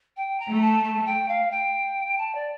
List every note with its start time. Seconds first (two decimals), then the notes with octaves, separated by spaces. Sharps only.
0.16 G5
0.40 A#5
0.50 A3
0.61 A5
0.84 A5
1.06 G5
1.28 F5
1.51 G5
2.17 A5
2.35 D5